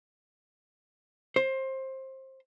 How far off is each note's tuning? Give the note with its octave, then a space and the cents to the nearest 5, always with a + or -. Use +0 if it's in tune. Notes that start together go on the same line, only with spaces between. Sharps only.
C5 +20